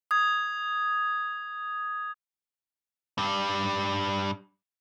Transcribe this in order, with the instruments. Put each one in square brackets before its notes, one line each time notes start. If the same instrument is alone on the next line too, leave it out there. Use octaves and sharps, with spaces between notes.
[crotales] D#6 G#6
[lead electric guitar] G2 G3